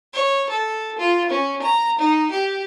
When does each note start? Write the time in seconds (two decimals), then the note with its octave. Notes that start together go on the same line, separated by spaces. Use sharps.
0.14 C#5
0.50 A4
0.98 F4
1.30 C#4
1.62 A#5
1.98 D#4
2.31 G4